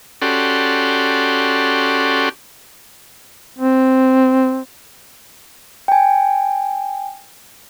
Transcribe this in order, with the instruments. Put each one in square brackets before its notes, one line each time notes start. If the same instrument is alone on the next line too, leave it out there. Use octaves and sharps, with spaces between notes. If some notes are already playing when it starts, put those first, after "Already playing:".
[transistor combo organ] C#4 F#4 G4 A4 D5 C6
[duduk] C4
[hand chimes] G5 G#5